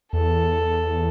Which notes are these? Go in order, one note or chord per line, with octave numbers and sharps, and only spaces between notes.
E2 A4